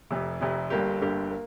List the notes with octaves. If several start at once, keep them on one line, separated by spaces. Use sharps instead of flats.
F1 F2 C3
F1 F2 C3
G1 G2 D3 A#3 G4
G1 G2 D3 A#3 G4
A#3